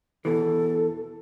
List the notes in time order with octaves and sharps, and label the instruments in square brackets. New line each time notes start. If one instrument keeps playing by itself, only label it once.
[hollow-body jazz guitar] E2 B2 E3 [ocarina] A4